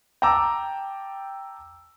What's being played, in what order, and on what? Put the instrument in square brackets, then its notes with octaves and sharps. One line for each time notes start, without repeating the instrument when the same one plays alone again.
[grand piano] G5 A5 A#5 D6 E6